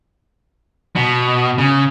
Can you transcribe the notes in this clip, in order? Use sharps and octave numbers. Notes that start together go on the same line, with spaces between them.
B2
C#3